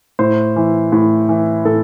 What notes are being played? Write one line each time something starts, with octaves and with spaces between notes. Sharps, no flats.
A2 C5
E3
A2
E3
A2 A4